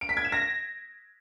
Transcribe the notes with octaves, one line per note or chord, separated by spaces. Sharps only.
D7
B6
G#6
E7
A#6